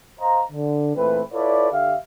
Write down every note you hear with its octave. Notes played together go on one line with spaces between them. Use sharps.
C5 D#5 F5 A#5
D3
A#2 E3 A3 C4 B4
E4 F4 A4 B4 C#5 D5
D3 G4 E5 F5